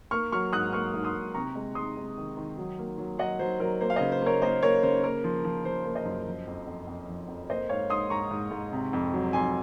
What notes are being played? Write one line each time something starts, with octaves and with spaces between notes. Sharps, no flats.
A#3 C#6 F6
F#3 C#6 F6
G#2 D#6 F#6
A#3 C#6 F6
G#2
C6 D#6
G#2
C3 A#5 C#6
G#3
G#3 C6 D#6
G#3
D#3
D#3
F#3
A#3
F#3
F#3 D#5 F#5
F#3 C5
F#3 A#4
A#3 C5
F5
C#3 C5 D#5
C5
A#3 A#4 C#5
A#3 C5 D#5
A#3 A#4 C#5
C#3 C5
A#3 A#4
F3
F3
F3 C5
A#3
C5 D#5
F#2
F3
F2
F2
F2
F3
F2
A#3 C5 D#5
G#2 C#5 F5
G#2 C6 D#6
G#2 A#5 C#6
G#2
G#2
C3
F2
F#3
F2 G#5 C6